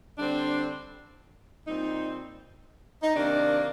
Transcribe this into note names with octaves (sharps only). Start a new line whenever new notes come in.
D3 G3 C4 D4
A#2 G3 C4 D#4
D#4
C3 D#3 A#3 D4